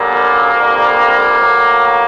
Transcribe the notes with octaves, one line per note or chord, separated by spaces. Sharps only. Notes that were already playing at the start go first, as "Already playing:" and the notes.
Already playing: F#2 D3 G3 A#3
F2 D3 G3
A2 F#3